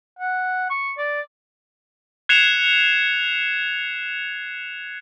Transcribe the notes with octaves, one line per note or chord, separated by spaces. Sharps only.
F#5
C#6
D5
F#6 G#6 C7 C#7 E7 F7